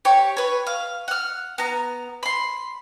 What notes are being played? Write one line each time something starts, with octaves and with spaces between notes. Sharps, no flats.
G4 C#5 C#6
B4 C#5
F5
F#5 F6
B3 A#5
B5 C6